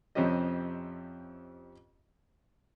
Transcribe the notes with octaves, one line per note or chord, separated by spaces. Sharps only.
F2 C3 F3 C#4 G4 D#5